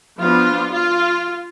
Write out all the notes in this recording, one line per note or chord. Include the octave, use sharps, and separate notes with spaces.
F3 B3 D4 F4
F4